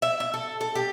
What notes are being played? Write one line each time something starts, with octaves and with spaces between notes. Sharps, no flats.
E5
E5
A4
A4
G4